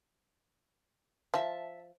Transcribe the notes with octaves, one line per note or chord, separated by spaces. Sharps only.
F3 E5 A5